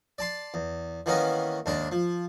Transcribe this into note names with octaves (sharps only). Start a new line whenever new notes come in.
D5 A5 C6
E2
D#3 E3 A#3 B3 C#4 A#4
D#2 G#2 D4 A#4
F3